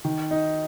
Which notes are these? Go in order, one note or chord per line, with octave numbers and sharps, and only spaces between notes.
D#3
D#4